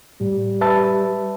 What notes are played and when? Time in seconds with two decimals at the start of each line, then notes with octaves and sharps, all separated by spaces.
0.21 A2 G3
0.61 B4 E5 A5